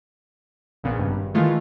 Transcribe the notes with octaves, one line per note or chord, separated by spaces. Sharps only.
A#1 A#2 C#3 B3
G#1 G2
D#3 E3 G#3 A3 F4